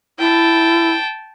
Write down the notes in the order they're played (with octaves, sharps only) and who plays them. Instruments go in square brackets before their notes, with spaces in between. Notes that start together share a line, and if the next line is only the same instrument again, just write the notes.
[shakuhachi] E4 [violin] G5 A5